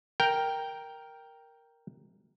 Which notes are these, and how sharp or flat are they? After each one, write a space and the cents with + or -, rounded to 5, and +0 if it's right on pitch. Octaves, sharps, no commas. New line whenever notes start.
A#4 +0 G5 +0